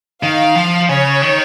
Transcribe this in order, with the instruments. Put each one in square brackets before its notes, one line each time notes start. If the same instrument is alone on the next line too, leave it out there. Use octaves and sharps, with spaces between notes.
[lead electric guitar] D#3 [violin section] F5
[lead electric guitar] F3
[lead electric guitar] C#3 [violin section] C#5
[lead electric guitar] D#3